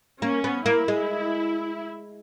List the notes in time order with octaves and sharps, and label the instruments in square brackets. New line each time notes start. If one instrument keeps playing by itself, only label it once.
[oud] A#3 [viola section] C#4
[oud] B3
[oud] A#3 [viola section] E4
[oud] G#3